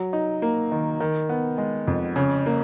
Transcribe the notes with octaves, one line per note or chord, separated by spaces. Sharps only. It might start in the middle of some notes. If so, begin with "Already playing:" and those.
Already playing: F#3
D#4
A#3
D#3
D#3
B3
G#3
F2
C#3
A#3